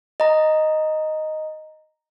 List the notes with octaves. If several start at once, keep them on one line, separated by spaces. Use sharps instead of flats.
D#5 A#5